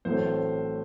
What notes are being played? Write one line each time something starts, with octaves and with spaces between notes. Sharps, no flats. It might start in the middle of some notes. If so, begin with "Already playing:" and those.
A1 A2 F#3 A3 C4 C5